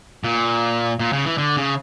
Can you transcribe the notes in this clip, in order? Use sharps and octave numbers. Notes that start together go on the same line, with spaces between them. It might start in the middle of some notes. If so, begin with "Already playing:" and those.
A#2
A#2
C#3
E3
D3
C#3